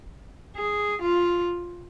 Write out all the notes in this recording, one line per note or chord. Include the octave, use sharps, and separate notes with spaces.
G#4
F4